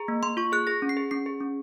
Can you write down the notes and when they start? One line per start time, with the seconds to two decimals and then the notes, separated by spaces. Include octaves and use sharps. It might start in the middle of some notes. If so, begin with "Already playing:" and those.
Already playing: G#4 A#5
0.08 A#3
0.23 A#3 C6
0.37 F4 C#6
0.52 G#4 F#6
0.67 G#4 A#6
0.82 C#4
0.89 C7
0.97 G#4
1.11 C#4 C7
1.26 G#4
1.40 C#4